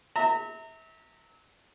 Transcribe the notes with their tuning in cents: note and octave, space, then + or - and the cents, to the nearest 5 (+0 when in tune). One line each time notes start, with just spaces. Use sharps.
E5 -30 A#5 -30